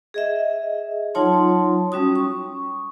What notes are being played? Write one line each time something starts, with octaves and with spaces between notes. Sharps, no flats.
G#4 D#5 E5
F#3 D#4 F4 C#5 A5 C6
G3 C#4 F#4 D#6
C#6